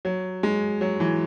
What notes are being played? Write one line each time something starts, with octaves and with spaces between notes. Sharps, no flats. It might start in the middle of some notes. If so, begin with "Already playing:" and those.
F#3
G#3
F#3
E3